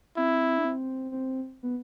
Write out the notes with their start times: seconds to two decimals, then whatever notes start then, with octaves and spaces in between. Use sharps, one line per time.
0.17 C4 E4
0.58 D4
0.65 C4
1.12 C4
1.63 B3